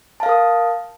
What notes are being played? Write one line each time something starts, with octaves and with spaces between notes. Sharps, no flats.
A#4 F5 A5 D#6